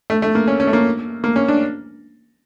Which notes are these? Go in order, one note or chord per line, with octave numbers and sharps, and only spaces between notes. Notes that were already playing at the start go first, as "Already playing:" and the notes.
A3
A3
A#3
C#4
C#4
A3
A#3
A#3
C#4
D4